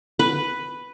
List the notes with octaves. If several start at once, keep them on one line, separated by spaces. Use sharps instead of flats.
B4